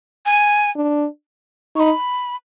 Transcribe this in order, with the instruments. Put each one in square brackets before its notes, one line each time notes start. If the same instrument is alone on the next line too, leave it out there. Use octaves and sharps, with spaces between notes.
[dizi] G#5
[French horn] D4
[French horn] D#4 [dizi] C#6
[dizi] B5